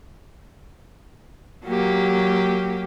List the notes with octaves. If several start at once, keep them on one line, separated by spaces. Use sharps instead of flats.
F#3 A#3 G4